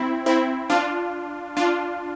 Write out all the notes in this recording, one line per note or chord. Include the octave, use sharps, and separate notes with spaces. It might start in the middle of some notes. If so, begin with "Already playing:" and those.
Already playing: C4 E4
C4 E4
D4 F4
D4 F4